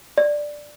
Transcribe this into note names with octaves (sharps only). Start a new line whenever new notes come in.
D5